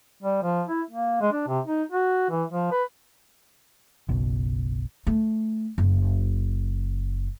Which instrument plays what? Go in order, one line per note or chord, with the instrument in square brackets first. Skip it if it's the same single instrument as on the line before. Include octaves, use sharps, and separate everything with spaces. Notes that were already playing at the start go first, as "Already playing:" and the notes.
[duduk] G3
F3
E4
A#3
G#3
D4
C3
D#4
F#4
E3
F3
B4
[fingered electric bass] F#1 B1 B2
[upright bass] A3
F#1